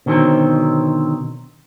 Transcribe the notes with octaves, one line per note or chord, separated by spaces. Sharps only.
B2 D3 D#3 F#3 C4